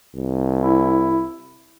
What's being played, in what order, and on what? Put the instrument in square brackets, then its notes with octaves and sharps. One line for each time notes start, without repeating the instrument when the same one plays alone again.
[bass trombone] C2
[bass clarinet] E4